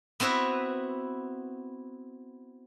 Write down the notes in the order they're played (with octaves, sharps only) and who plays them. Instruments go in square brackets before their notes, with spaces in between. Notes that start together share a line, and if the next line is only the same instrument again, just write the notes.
[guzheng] B3 C4 E4 F#4 B4